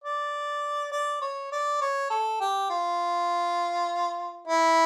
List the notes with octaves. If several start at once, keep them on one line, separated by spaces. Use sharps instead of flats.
D5
D5
C#5
D5
C#5
A4
G4
F4
E4